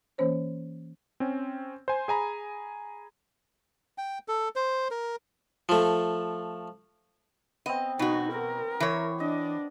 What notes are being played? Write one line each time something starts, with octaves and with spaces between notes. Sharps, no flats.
E3 A#3 C#4 C5 C#5
C4 C#4
C5 G#5
G#4 G#5 A#5 B5
G5
A4
C5
A#4
F3 A3
B3 C4 D#5
B2 D#4 F#4
A#4
E3 C#5
D4 D#5